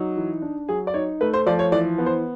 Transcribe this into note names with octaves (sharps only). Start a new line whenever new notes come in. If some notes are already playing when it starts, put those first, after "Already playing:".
Already playing: F#3 D#4
E3
D4
F#3 G#4
D5
D#4 C#5
A3 B4
C5
F3 D5
C#5
E3 D5
B3
C5